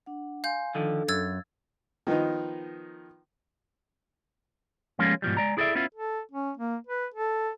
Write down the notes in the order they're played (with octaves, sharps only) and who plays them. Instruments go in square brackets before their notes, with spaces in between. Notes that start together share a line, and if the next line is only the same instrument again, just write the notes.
[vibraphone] D4 F#5
[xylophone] F5 G6 [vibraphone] G#5 C6
[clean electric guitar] D3 D#3 F3 [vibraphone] D4 A4
[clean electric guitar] F#2 [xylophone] E6 G#6 A6
[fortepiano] D#3 F3 B3 D#4
[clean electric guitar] F3 G3 G#3 A#3 B3 C#4
G#2 B2 F3 G3
G#3 D5 A#5
E4 G#4 A4 C#5 D5 E5
B3 C#4 E4 F4
[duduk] A4
C#4
A#3
B4
A4